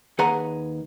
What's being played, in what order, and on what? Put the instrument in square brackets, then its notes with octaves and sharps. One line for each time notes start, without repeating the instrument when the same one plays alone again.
[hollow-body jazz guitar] D#2 G#4 B4 F#5 G#5 A#5